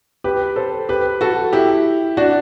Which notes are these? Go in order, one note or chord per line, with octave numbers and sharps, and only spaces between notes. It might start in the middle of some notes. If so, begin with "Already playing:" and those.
G4 B4
A4 C5
G4 B4
F#4 A4
E4 G4
D4 F#4